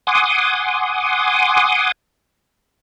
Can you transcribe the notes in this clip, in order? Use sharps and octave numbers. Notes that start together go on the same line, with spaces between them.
F#5 G#5 C6 D6 D#6